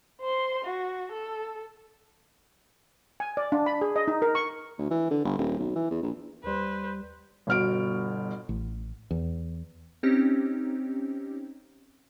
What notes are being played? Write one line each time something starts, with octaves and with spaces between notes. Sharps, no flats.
C5 C6
F#4
A4
G#5
D5
D4
B5
G#4
D#5
D#4
A#4
C#6
D2
E3
D3
G1
D#1
B1
E3
E2
A#1
D#2 G3 B4 C5
G1 B2 F6 D7
A1
E2
C4 C#4 D#4 G4